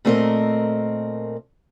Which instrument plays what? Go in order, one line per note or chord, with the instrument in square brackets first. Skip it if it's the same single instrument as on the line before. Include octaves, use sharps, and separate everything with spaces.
[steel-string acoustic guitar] A#2 A3 C4 G#4 A#4 D#5